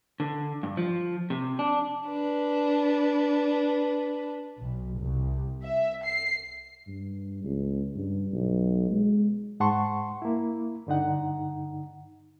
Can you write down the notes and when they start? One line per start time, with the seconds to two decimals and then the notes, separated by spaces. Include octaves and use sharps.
0.20 D3
0.63 G2
0.77 F3
1.30 C3
1.59 D4
2.07 D4 B4
4.61 B1
5.00 C2
5.64 E5
6.05 C7
6.87 G2
7.44 C#2
7.95 G2
8.33 B1
8.91 G#3
9.60 G#2 G#3 F#5 A5 C6 C#6
10.22 A#3 E4
10.87 G2 D3 D#4 F#5